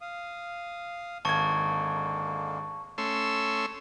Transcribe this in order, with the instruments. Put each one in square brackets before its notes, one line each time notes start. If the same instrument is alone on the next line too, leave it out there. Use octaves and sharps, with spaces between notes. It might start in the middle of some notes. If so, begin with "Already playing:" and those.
[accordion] F5 D#6
[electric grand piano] G#1 G#6 [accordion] D3 G#3 A#3 [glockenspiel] A5 C#6
[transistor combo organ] A3 C#4 C6 E6